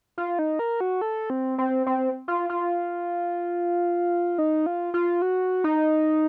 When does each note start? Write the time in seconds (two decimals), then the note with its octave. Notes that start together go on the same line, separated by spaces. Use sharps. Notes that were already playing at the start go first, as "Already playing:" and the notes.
0.18 F4
0.39 D#4
0.59 A#4
0.81 F#4
1.01 A4
1.30 C4
1.58 C4
1.86 C4
2.28 F4
2.49 F4
4.38 D#4
4.66 F4
4.94 F4
5.22 F#4
5.64 D#4